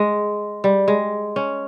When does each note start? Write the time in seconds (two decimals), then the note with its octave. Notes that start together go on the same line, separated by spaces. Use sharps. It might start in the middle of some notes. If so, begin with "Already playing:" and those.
Already playing: G#3
0.64 G3
0.88 G#3
1.36 C#4